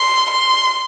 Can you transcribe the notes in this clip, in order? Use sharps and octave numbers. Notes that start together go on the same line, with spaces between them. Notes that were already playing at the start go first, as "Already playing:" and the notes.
Already playing: C6
C6